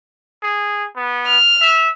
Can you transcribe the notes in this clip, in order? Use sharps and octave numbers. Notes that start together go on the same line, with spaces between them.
G#4
B3
F6
E5